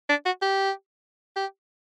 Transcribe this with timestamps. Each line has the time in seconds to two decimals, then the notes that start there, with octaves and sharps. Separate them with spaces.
0.09 D4
0.25 F#4
0.42 G4
1.36 G4